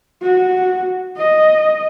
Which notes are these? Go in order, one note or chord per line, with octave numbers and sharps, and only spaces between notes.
F#4
D#5